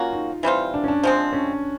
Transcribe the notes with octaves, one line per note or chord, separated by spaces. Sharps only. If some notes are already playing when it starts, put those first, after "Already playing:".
Already playing: A#3 C#4 F4 F#4
D#4
E3 G3 C4 F4
D4
C#4
D4
F3 G#3 C4
C#4